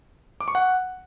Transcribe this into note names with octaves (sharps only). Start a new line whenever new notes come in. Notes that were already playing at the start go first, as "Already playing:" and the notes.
D6
C#6
F#5